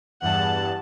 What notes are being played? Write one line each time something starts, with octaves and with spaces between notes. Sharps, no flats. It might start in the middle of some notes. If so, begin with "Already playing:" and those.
E2 G2 F#5 A5